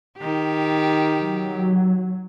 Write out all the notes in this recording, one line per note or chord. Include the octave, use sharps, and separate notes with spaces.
D#3 G4
F#3